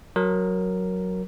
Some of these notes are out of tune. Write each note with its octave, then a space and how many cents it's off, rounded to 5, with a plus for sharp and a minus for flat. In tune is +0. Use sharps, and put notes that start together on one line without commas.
F#3 +0 A#4 +0